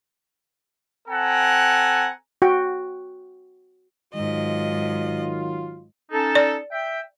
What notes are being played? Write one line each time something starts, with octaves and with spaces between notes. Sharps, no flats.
C4 A4 F#5 G#5 A#5
F#4 G5
G#2 D#3 F#3 F4 D#5
C#4 D#4 A4
D5
E5 G5